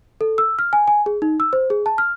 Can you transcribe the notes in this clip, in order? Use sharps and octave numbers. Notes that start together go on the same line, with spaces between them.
A4
E6
F6
G#5
G#5
G#4
D#4
E6
C5
G#4
A5
F6